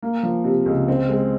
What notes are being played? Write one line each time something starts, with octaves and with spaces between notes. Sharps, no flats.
A#3
F3
C3
C#2
C4
G#3